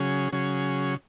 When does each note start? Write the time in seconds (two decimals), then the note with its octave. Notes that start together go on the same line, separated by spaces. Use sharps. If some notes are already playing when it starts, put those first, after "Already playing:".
Already playing: C#3 F#3 C#4 G#4
0.32 C#3 F#3 C#4 G#4